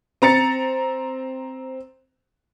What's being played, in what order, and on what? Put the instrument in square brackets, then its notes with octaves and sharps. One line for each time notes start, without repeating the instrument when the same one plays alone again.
[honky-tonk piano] C4 A#5 A6 C#7